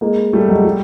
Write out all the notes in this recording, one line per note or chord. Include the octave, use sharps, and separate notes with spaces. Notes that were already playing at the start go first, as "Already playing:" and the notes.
G#3 A#3
G3 A3
F#3 G#3
G3